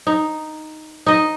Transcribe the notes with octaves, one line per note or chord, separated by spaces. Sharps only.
D#4
D#4 D#5